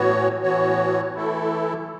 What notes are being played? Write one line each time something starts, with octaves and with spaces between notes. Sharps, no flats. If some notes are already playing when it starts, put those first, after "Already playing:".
Already playing: A2 E3 B3 F#4 C#5
A2 E3 B3 F#4 C#5
E3 A3 E4 A4